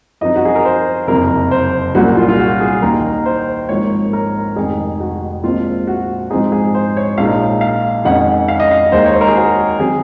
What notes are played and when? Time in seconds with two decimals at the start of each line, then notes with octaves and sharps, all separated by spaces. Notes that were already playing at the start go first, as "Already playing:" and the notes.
0.21 F#2 F3 C4 D#4 D#5
0.36 F#4
0.45 G#4
0.55 A#4
0.65 C5
1.08 F#1 F2 C3 A#4
1.51 C5
1.95 C2 A#2 F#3 A#3 C#4 F#4
2.17 F4
2.29 F4
2.39 F#4
2.61 G#4
2.82 D#2 D#3 A#3 D#4 A#4
3.26 C5
3.69 G#1 G#2 F3 A#3 C#5
4.13 A#4
4.56 F1 F2 D#3 G#3 D#4 G#4
5.00 F#4
5.44 A#1 A#2 G#3 C4 F4
5.87 F#4
6.30 G#2 F3 C4 D#4 G#4
6.52 G#4
6.74 C5
6.97 C#5
7.18 A#1 A#2 G#3 D#4 F5
7.61 F5
8.05 F2 D#3 G#3 C#4 F#5
8.48 F5
8.60 D#5
8.71 F5
8.92 D#2 D#3 G#3 D#4 C5
9.06 C#5
9.14 C5
9.21 A#4
9.28 G#4
9.36 F#4
9.79 D#3 F#3 C4 G#4